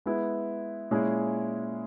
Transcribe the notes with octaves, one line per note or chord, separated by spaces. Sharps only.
G#3 B3 E4 B4
A#2 G#3 C#4 E4 G#4